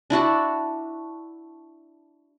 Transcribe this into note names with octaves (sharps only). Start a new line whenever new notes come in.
D4 E4 F#4 A5